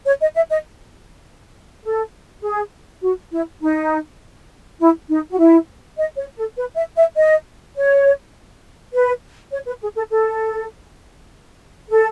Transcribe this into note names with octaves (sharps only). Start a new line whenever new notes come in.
C#5
D#5
E5
D#5
A4
G#4
F#4
E4
D#4
E4
D#4
F#4
E4
D#5
C#5
A4
B4
E5
E5
D#5
C#5
B4
C#5
B4
G#4
A4
A4
A4